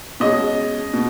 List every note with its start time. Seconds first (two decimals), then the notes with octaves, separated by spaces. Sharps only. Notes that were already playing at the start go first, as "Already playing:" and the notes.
0.20 B2 G#3 C#4 D#5
0.94 B2